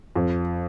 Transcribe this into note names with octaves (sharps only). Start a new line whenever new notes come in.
F2